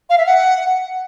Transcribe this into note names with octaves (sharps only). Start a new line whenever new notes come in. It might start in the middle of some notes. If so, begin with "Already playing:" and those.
F5
E5
F#5